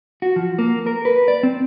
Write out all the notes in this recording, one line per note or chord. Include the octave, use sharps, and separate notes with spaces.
F#4
F3
A#3
A#4
B4
D5
C4